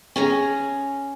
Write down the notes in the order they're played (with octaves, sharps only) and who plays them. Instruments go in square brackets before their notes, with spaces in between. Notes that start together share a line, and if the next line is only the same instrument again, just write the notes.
[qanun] C#4 G#4 A#5